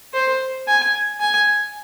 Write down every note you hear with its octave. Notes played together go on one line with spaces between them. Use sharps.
C5
G#5
G#5